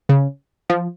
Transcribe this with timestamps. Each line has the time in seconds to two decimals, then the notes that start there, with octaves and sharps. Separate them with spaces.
0.09 C#3
0.70 F3